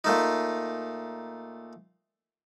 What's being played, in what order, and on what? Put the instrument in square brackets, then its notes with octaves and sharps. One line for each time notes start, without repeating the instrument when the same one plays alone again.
[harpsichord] A#2 A3 D#4